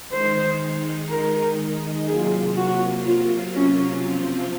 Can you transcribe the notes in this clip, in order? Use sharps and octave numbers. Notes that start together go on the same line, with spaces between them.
D#3 G#3 D#4 C5
A#4
C3 F#3 A#3 F4 G#4
F#4
F4
C#4
C3 F3 C4 F4